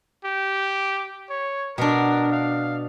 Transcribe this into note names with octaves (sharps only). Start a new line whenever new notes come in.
G4
C#5
B2 D4 A#4
F5